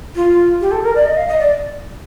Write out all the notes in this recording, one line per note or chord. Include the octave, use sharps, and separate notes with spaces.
F4
G4
A4
A#4
D5
D#5
F5
D#5
D5